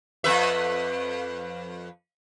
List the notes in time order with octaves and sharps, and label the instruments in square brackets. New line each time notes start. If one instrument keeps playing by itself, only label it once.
[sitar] F2 B4 E5